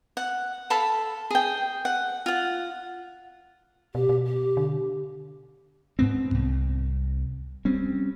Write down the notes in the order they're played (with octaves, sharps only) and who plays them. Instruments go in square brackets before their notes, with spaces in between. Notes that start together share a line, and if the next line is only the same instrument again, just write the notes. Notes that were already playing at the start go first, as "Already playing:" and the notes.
[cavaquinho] F#5
A4 F5 A5 B5
G#4 G5
F#5
F4 F#5
[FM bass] B2 [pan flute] G4
[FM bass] B2
[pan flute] G4
[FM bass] D3
[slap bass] G#2 B3 C4
C2
G3 C4 C#4